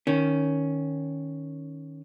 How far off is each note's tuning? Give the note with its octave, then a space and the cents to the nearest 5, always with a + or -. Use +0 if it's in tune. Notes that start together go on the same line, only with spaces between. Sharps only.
D#3 -5 C#4 +0